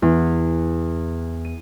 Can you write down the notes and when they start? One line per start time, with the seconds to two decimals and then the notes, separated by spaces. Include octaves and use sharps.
0.02 E2
1.45 D#7